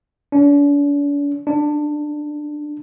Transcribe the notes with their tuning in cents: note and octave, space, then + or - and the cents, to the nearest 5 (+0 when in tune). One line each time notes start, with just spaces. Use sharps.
D4 -45
D4 +15